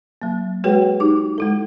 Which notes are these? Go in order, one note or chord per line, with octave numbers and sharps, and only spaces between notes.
F#3 A#3
G#3 F#4 G#4 B4 C#5 G5
D#4 G4 D6
G#3 E4 A4